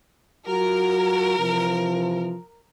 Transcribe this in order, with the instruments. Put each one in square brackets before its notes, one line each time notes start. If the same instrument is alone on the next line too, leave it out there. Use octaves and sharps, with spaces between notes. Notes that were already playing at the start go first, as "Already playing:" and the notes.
[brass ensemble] F#3 F4 F#4 [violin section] A#4
[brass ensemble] C3 E3 F3